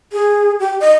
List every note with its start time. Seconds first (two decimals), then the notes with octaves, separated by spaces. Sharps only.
0.13 G#4
0.60 G4
0.80 D#5